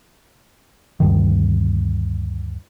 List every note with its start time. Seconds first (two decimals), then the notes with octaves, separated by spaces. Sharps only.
1.00 D2 G2 D#3